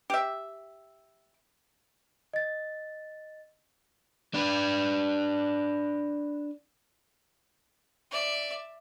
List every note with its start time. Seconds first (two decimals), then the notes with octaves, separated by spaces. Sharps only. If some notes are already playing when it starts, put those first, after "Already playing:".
0.10 G4 E5
2.33 D#5 A6
4.34 D4 B4
8.11 D5 E5